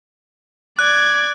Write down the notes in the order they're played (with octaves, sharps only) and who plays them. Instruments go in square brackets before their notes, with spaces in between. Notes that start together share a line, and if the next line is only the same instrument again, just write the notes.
[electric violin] D5 G#6 [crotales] F#6